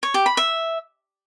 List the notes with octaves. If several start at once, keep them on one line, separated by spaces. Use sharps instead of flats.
C#5
G4
B5
E5